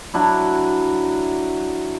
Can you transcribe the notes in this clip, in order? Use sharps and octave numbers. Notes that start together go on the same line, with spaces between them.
F#3 D4 E4